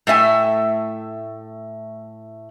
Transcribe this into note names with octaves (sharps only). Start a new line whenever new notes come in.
A2 A3 E5 G#5